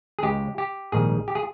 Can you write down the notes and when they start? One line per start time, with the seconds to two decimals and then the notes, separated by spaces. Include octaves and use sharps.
0.19 G#4
0.22 C#2 C#3 G#3 G4
0.58 G4
0.92 A#1 G#2 D#3 G3 G#4
1.28 G4
1.35 G#4